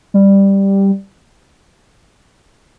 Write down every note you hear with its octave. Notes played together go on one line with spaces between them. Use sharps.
G3